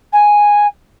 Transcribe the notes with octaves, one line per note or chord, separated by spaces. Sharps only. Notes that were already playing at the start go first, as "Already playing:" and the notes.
G#5